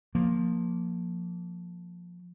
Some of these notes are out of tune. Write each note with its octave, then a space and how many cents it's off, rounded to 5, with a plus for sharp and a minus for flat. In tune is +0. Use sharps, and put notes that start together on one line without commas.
F3 +15 A#3 +0